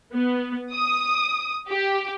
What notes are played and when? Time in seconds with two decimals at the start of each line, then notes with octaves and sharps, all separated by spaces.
0.14 B3
0.73 D#6
1.69 G4